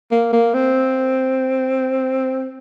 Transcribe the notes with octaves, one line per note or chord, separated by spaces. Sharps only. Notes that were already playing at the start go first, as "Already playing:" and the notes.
A#3
A#3
C4